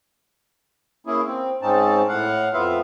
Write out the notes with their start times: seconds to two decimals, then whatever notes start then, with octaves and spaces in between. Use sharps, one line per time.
1.07 A#3 C#4 E4 G#4
1.27 C4
1.62 G#2 C4 C#4 D#4 A5
2.09 A2 F5 F#5
2.54 F2 B3 F4 E5 F5